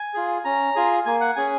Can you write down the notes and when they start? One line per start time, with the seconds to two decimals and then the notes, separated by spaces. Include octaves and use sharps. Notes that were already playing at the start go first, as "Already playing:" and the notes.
Already playing: G#5
0.14 F4 G#4
0.45 C#4 A#5
0.76 F4 G#4
1.06 A#3 G#5
1.21 F#5
1.36 C#4 G#4 G#5